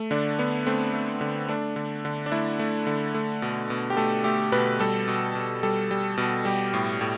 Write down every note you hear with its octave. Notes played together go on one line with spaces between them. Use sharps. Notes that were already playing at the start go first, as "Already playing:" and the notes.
Already playing: A3
D3 D4
D3 B3
A3 C4
A3
D3
A3 D4
D3
D3
D4
A3 E4
A3
D3
A3
B2
B2
G4
A3 A4
A3 G4
B2 B4
G3 A4
B2
B2
G3 A4
G3
B2
G3 G4
A2
A2